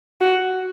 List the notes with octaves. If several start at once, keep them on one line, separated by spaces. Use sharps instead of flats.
F#4